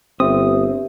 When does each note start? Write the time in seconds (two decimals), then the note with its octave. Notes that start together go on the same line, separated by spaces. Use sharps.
0.20 G1 C4 G4 E5 D#6